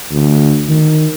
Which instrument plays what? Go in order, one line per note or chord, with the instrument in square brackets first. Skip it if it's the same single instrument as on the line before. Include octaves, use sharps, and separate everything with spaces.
[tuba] D2
D#3